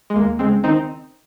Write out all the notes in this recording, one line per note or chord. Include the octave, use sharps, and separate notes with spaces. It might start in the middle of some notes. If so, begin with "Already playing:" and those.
G#3
D#2 A#3
C#3 G#3 C4
D#3 C4 D#4